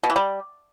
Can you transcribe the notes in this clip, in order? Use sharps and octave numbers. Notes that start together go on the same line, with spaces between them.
B2
E3
G3